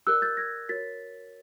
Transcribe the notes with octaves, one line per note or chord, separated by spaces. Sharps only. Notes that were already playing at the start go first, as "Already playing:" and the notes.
G4 A#4 D5 E6 F#6
G6 A6
G#6 A#6
F#4 A#4 C#5 A6 B6